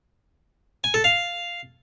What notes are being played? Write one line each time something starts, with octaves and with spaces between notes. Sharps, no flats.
G#5
A4
F5